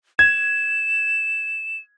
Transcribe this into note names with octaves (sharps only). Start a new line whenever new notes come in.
G#6 E7